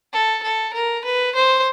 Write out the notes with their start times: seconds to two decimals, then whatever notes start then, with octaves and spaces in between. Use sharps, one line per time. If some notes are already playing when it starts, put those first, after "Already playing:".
0.13 A4
0.43 A4
0.74 A#4
1.05 B4
1.35 C5